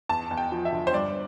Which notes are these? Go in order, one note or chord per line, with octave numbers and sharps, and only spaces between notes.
E2 A5
E2
G5
F3
E5
D3
C5
G2 D5